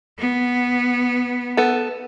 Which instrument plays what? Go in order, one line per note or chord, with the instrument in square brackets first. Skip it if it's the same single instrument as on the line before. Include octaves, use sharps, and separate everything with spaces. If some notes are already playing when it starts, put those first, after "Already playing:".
[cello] B3
[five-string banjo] B3 A4